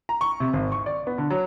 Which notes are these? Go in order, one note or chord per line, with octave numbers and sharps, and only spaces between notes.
A#5
C#6
C3
G#1
C#6
D5
B3
D3
F#3